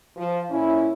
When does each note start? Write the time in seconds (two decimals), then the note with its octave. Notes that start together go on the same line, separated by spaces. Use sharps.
0.16 F3
0.50 A#2 C#4 E4